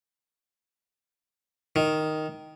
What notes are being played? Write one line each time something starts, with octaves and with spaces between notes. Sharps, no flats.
D#3